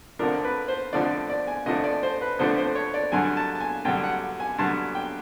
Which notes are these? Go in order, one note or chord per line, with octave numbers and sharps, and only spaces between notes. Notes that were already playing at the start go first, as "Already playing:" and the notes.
F2 D3 F3 A3 D4 A#4
B4
C5
F2 D3 F3 A3 D4 D5
D5
G#5
F2 D3 F3 A3 D4 D#5
D5
C5
B4
F2 D3 F3 A3 D4 C5
C5
C#5
D5
G2 D3 F#3 G#5
A5
A5
G#5
G2 D3 F#3 G5
F#5
G#5
G2 D3 F#3 A5
G5